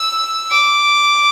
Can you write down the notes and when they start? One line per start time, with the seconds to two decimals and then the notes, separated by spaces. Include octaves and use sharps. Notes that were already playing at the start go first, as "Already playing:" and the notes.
Already playing: E6
0.51 D6